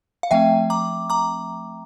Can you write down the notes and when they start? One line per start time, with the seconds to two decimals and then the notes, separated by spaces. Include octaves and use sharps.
0.23 F5
0.31 F3 A3 C4 E5 G5
0.70 A#5 D6
1.10 A#5 D6